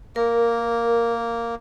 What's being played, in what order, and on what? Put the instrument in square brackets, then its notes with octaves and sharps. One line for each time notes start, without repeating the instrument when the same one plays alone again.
[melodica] A#3 [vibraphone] A#4